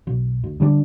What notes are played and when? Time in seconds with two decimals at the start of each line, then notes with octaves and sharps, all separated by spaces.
0.07 B1
0.44 D2
0.60 D3 G3 A#3 D4